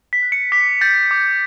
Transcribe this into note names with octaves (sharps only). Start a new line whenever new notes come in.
B6
F#6
C#7
D6 B6
G6 A6
D6